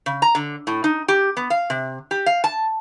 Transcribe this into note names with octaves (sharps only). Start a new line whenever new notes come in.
C#3
A#5
D3
A2
D#4
G4
B3
F5
C3
G4
F5
A5